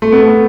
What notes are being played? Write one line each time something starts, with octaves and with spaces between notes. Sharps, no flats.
A3
B3
A3